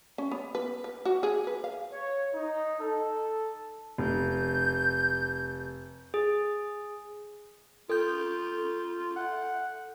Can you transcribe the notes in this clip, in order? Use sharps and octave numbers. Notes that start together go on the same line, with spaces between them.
C#4
B3
B4
B4
F#4
G#4
B4
F5
C#5
D#4
A4
F1 G6
G#4
F4 A4 G6
F#5